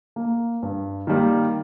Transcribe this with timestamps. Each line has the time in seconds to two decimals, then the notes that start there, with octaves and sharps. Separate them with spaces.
0.16 A#3
0.63 G2
1.07 D#3 G3 A#3